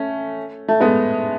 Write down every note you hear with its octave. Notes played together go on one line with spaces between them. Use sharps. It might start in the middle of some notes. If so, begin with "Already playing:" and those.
Already playing: A3 C#4
A3
G#3 B3